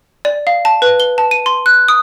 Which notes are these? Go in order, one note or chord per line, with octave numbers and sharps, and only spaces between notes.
D5
F5
A5
B4
G7
A5
D#7
C6
F#6
D#6